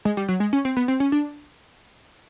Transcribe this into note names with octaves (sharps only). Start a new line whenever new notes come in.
G#3
G3
F#3
G#3
C#4
C4
B3
C4
C#4
D4